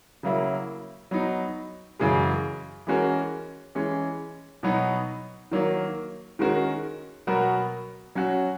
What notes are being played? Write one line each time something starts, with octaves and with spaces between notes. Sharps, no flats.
C#3 F#3 A#3 E4
F#3 B3 D#4
F#2 C#3 E3 G#3
E3 G#3 C#4 F#4 A#4
E3 G#3 C#4
B2 F#3 B3 D#4
D#3 F#3 A#3
D#3 G#3 C#4 F#4 A#4
B2 F#3 B3 F#4 A#4
F#3 C#4 F#4